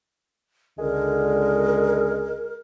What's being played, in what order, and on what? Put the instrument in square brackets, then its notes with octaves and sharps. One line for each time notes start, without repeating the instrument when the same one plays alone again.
[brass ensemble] C#2 D3 [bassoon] G#3 [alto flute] A#4